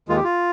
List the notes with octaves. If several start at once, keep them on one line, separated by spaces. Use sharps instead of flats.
D#2 D#3 G#3 F4
G4
F4